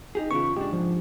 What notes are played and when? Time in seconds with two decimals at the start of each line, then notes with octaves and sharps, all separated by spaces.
0.15 D#4 G4 G#4
0.31 E2 C#3 B3 F4 C#6
0.57 G#2 D4 G4
0.73 F3